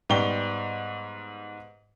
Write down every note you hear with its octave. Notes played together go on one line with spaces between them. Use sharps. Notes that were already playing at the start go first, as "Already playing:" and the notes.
G#2 G3 B3 G5 C#6 G7